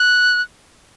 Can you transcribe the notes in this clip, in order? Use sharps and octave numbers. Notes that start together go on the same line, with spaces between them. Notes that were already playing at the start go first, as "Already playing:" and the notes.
Already playing: F#6